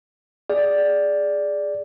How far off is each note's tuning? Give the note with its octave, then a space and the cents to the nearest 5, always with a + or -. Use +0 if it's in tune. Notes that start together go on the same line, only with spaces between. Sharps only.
G#4 +0 D5 +0